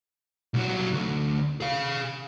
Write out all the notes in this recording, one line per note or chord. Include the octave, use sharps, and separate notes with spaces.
C2 F#3
D2
G#4 F5